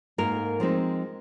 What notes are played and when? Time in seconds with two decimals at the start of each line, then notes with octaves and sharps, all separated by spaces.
0.18 G#2 A#3 A#4
0.60 F3 G#3 C4 D#4